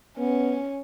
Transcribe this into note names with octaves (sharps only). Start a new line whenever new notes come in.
B3 C#4